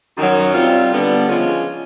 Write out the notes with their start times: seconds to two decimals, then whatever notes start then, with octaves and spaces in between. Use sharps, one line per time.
0.16 F#2 D#3 F#3
0.53 C3 D#3 G3 C4 F4
0.91 D3 G3 B3
1.27 C#3 F3 G#3 C#4 F4